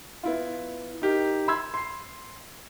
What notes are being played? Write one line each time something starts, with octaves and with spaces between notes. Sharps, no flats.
B3 E4 F4
D#4 G4 A#4
B5 C6 E6 G#6
C6 C7